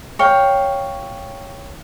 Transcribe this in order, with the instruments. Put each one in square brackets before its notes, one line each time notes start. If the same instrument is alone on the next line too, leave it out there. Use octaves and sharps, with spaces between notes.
[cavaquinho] C#5 F5 G5